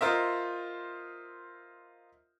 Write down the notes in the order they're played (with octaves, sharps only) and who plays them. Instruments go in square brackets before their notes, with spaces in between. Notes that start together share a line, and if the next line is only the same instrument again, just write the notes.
[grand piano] F4 A#4 C5 D#5 E5